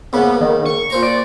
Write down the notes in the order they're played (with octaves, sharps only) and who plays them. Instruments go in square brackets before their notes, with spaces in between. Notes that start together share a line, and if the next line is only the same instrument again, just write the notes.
[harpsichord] G#2 C#3 A#3 [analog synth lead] B3
[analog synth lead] D#3
C#6
[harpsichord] A#2 C5 A#5
[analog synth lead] D5